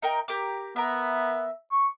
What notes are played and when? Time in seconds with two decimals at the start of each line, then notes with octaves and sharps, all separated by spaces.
0.02 D#4 A#4 G5
0.28 G4 A#4 D6
0.76 B3 A#4 E5
1.71 C#6